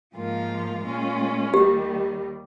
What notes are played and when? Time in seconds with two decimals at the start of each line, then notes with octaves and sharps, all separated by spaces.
0.15 G#2 F3 A#3 F4
0.84 A#2 G#3 C#4 F4
1.53 D#2 D#3 G3 G4